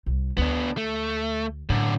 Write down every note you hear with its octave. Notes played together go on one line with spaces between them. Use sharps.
C2
D2 B3 D4
A3
F#2 A2 D3